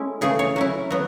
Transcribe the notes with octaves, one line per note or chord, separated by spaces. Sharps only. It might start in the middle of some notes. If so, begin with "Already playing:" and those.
Already playing: G#3 C#4 E4 A4
C#3 E3 A3 G#4
C#5
F#3 C#4 E4
F#3 B3